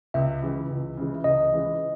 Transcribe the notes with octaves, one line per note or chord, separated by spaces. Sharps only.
C#2 E5
C#3 E3 G#3
C#2
C#3 E3 G#3
C#2 D#5
C#3 E3 G#3